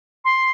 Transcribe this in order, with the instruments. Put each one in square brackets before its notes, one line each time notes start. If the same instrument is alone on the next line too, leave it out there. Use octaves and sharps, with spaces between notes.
[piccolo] C6